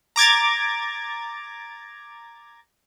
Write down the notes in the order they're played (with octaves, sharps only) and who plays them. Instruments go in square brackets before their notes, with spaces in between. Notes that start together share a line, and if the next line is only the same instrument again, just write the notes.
[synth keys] A#5 D6 G#6 A6